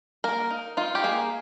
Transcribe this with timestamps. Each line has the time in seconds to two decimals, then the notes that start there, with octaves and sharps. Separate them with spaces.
0.24 A#3 A#4
0.50 D#4
0.77 D#4 F4
0.95 G4
1.04 A#3 G#4